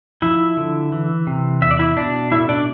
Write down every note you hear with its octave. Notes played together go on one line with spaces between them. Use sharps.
F3 E4 E5
D3
E3
C3
E2 E5
D5
E4 E5
B2 D4 D5
A2 E4 E5
D4 D5